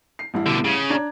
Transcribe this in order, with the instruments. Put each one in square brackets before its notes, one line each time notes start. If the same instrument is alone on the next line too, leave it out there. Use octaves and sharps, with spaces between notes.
[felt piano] C7
A1 G2 E4
[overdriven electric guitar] B2 D3
C#3
[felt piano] D4 A#5 G#6